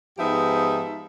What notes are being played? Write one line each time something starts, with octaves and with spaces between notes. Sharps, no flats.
G#2 F3 B3 D#4 G4 E5